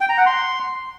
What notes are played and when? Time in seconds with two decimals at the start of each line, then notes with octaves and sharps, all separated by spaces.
0.01 G5
0.09 A#5
0.18 F#5
0.26 C6